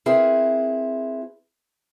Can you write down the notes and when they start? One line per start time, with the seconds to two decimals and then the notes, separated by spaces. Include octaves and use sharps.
0.06 C4 E4 G#4 A#4 B4